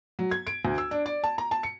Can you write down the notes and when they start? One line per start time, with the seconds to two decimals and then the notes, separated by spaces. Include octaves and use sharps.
0.19 F#3
0.31 G#6
0.47 D7
0.65 D2
0.78 E6
0.91 D4
1.06 D5
1.24 A5
1.38 A#5
1.51 A5
1.63 C#7